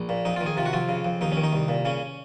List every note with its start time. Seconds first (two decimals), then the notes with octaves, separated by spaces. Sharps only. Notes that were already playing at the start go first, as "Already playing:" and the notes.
Already playing: A#1
0.09 A#2
0.25 F2 D#4
0.36 F4
0.41 D#3
0.46 G#4
0.57 C3 F4
0.66 F#4
0.73 F2 F4
0.89 C#3
1.05 F2
1.21 D#2 D#4
1.32 C#4
1.37 D#3
1.43 D#4
1.53 C2
1.68 A#2
1.85 C#3 C#4